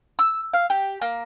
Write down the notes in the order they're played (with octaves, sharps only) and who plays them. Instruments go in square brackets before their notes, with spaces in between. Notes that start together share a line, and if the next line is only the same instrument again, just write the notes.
[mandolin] E6
F5
G4
A#3